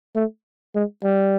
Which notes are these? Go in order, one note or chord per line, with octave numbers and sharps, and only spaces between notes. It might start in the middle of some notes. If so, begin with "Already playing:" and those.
A3
G#3
G3